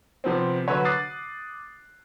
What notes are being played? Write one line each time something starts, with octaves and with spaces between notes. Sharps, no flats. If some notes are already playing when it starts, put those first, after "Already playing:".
C3 F3 B3 C4
D3 F#3 B4 C#5
D6 D#6 F#6 A6 C7